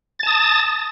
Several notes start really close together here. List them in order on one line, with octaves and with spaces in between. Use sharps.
A6 A5 D#6